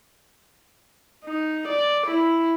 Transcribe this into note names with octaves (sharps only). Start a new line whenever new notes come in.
D#4
D5
E4